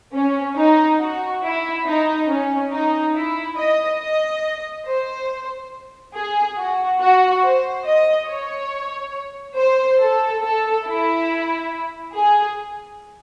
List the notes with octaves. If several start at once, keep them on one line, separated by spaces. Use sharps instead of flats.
C#4
D#4
F#4
E4
D#4
C#4
D#4
E4
D#5
D#5
C5
G#4
F#4
F#4
C5
D#5
C#5
C5
A4
A4
E4
G#4